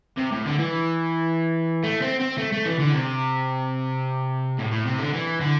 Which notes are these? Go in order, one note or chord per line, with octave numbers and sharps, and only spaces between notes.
C3
A2
D3
E3
A3
C4
C4
A3
A3
E3
D3
C3
A2
A2
C3
D3
E3
D3